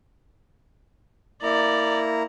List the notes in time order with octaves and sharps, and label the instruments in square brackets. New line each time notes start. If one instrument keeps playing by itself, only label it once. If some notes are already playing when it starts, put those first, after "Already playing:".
[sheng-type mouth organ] A#3 E4 A#5 [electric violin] D5